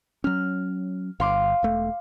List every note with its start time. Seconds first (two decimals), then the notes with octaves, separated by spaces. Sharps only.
0.24 F#3 C#4 F6
1.20 G1 F5 C6 D6
1.63 E1 A3